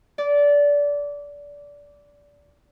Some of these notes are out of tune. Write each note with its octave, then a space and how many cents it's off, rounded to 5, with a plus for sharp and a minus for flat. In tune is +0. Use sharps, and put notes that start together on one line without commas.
D5 -20